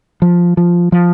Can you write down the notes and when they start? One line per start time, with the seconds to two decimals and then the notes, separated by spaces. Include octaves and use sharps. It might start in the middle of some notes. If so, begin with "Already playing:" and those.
0.22 F3
0.57 F3
0.92 F3